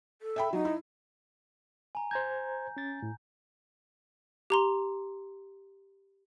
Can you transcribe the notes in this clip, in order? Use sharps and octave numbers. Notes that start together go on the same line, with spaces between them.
A4
E5 G5 B5
F#3 D#4
E4
G#5 A#5
C5 A#5 G6 G#6
C#4 A6
A2
G4 A#5 C6